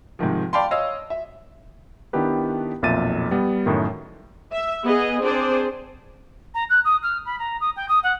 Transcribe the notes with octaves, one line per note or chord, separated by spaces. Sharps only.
G#2 C3 D#3 F3
D5 F5 G5 A5 B5 C6
C#5 D#5 F5 E6
E5
D#3 B3 D4 E4 G4 B4
B1 F2 A#2 E5 A6 D#7
G3 B3
F#2 A2 D#3
E5
B3 G#4 D#5
C4 D4 G#4 C5 D5
A#5
F#6
D#6
F6
B5
A#5
D#6
G5
D#6
F#5